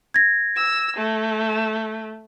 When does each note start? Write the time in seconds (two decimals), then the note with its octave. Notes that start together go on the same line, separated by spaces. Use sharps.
0.14 G#6 A#6
0.56 E6
0.97 A3